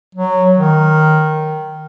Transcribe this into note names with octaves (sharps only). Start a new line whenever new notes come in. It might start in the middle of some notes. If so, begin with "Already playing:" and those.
F#3
D#3